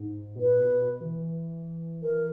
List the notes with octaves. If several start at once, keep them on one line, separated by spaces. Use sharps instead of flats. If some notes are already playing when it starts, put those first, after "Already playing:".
Already playing: G#2
B2
A#2 B4
B2
B2
E3
E3 A#4